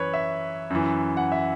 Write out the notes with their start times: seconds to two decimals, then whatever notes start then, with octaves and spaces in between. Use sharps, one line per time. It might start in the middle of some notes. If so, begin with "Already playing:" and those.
Already playing: F#2 E3 B4 C#5
0.14 E5
0.70 F#2 E3
1.17 F#5
1.32 E5